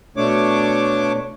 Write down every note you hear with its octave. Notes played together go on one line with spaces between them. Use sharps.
B2 A3 D4 C#5 D6